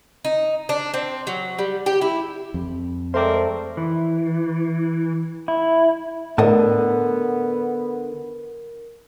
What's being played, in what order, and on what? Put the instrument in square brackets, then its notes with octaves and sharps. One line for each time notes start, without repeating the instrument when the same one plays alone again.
[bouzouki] D#4
D4
C4
F#3
G3
G4
E4
[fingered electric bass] F2
[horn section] G#3 C4 A#4 [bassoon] A3 [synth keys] C5 D5
[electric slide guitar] E3
E4
[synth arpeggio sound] A2 [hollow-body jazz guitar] D3 D#5 A5 [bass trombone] B3 [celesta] A#4